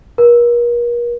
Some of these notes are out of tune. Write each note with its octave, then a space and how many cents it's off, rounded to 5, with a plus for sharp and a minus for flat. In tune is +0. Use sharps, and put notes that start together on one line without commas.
A#4 +40